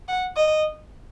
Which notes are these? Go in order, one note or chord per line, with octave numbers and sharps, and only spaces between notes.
F#5
D#5